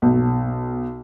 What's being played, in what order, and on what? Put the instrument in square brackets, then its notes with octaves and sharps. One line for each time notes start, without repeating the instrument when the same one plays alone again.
[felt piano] B1